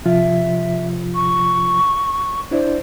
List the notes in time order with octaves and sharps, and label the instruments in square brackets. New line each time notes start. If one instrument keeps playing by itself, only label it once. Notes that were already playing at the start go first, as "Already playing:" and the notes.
[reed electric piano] C3 F3 F4 [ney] E5
[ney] C#6
[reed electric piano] D4 E4 D5 [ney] C5